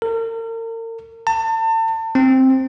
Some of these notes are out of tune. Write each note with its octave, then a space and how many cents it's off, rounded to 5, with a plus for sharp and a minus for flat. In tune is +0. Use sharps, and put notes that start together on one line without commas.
A#4 -40
A5 +35
C4 +5